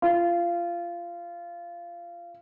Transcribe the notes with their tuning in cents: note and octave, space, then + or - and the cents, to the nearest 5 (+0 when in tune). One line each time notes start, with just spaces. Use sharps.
F4 -20